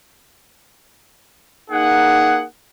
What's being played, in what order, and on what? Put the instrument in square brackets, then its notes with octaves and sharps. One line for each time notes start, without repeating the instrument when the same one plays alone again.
[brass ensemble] A#3 D#4 G#4 F#5